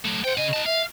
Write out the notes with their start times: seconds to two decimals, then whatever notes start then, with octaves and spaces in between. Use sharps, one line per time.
0.05 F#3 A3
0.24 C5 F#5 G5
0.38 C#3 D#5 G#5
0.53 D#4 A5
0.66 E5 F5